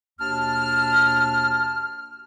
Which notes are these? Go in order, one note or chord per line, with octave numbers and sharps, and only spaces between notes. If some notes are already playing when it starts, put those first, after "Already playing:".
D#2 B2 D4 A5 F6